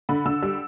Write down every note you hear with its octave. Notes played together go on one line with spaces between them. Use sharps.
D3 B5
D3 E6
G3 E6